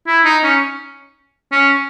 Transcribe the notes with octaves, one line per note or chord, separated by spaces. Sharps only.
E4
D#4
C#4
C#4